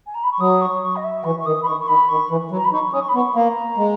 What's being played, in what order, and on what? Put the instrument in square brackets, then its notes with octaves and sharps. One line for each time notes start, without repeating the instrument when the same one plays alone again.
[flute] G#5
A#5
B5
C#6
[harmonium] F#3 [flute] D#6
[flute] C#6
C#6
D#5
E5
[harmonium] E3 [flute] C#6
[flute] C#6
[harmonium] D#3 [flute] D#6
[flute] B5
[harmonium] D#3 [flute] C#6
[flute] C#6
[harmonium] D#3 [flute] B5
[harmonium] D#3 [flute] C#6
[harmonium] E3
F#3
[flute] A#5
B5
[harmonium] D#4 [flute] C#6
[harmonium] C#4 [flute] D#6
[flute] C#6
B5
[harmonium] B3 [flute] C#6
[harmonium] A#3 [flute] A#5
[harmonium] G#3